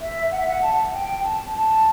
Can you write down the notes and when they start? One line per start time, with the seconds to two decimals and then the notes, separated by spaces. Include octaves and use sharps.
0.01 E5
0.32 F#5
0.40 E5
0.48 F#5
0.62 A5
0.93 G5
1.23 A5
1.55 A5